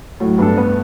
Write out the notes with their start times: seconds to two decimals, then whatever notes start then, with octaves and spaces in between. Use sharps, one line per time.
0.20 A2 F#3
0.38 G2 B3 D4 A4
0.57 B3